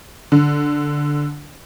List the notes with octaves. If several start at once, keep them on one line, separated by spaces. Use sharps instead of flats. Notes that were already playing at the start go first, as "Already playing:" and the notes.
D3